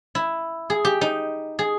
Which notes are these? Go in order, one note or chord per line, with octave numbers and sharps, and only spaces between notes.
E4
G#4
G4
D#4
G#4